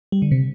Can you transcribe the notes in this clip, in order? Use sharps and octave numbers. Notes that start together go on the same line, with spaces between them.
G3
D3
C3